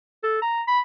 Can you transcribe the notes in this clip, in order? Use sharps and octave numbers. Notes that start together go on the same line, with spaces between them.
A4
A#5
B5